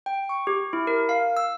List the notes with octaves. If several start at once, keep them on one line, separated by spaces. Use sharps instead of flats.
G5
C#6
G4
E4
A#4
F5
E6